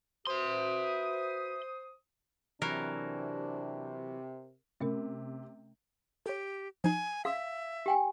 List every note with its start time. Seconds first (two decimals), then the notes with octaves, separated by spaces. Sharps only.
0.27 F#4 B4 C5 E5 C6 D#6
2.62 C3 E3 F#3 D4 A#4
4.81 C3 A3 C#4 A#4
6.26 G4 A4 C#5
6.84 F3 D#4 G#5
7.25 G#4 E5 F5 C6 D#6
7.86 G4 G5 G#5